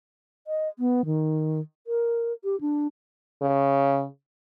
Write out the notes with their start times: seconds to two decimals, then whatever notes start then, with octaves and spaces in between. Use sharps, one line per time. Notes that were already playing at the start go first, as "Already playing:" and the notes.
0.47 D#5
0.79 B3
1.05 D#3
1.87 A#4
2.44 G4
2.61 D4
3.42 C#3